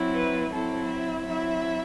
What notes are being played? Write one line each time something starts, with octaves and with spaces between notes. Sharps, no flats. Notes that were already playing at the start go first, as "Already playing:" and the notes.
Already playing: F#3 C4 E4
B4
F#3 C4 E4 A4
E5
F#3 C4 E4 E5